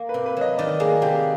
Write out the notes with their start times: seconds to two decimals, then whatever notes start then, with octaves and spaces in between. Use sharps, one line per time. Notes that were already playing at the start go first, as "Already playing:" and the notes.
Already playing: A#3
0.09 B4
0.14 C3
0.26 B4
0.37 F#3 D#5
0.58 D#3 D5
0.80 A#3 G#4
1.02 C3 G4